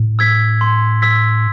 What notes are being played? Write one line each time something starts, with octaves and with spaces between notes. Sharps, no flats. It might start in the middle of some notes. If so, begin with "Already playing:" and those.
Already playing: A2
E6 G#6 B6
C6
E6 G#6 B6